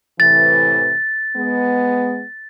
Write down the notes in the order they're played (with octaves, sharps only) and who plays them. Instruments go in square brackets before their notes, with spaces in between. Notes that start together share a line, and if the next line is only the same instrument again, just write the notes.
[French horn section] A2 C3 E3 [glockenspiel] A6
[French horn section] G#3 B3